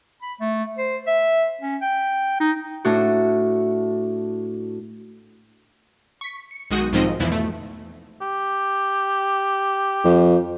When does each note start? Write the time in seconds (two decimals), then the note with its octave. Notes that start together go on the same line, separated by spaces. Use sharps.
0.22 B5
0.40 A3
0.78 C5
1.07 E5
1.61 C#4
1.81 G5
2.40 D#4
2.85 A2 D4 F#4
6.21 C#6 B6
6.51 C#7
6.71 B1 D#3 G#3 F#4 D#6 G6
6.93 B1 G#2 D#3 F3 C4 D#5
7.20 E2 B2 E3 F3 E4
7.32 A3
8.21 G4
10.05 F2